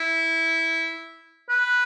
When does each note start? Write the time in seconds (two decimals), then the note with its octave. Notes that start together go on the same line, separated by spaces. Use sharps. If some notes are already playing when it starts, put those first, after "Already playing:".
Already playing: E4
1.49 B4